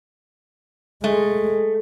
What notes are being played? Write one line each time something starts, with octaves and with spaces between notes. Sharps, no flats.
G#3 A3